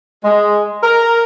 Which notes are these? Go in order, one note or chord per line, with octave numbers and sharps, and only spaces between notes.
G#3
A#4